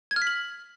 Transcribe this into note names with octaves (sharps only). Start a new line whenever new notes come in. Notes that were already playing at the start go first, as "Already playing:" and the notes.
G#6
F6
B6
F#7